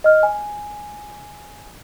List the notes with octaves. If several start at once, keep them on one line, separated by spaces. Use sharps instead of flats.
D#5 F6
G#5